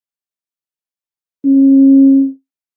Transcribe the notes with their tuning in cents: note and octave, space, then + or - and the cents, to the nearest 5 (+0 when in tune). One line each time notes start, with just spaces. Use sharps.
C#4 -35